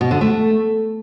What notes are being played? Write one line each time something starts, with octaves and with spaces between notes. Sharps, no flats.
B2
D3
A3